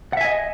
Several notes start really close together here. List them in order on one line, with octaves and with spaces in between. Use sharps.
F#5 E5 G#5 D#5